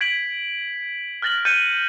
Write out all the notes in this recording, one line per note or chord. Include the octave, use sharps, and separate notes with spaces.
G#6 B6 D7 F#7
F6 F#6 A6 A#6 F#7
F#6 G6 A6 C#7 D#7